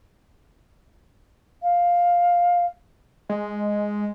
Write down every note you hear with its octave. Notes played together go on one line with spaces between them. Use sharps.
F5
G#3